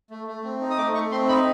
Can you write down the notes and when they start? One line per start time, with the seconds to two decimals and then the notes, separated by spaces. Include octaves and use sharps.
0.10 A3
0.27 A3
0.44 C4
0.61 D#4
0.70 D#6
0.78 A3 D6
0.94 A3 C#6
1.11 C4 C6
1.28 D#4 B5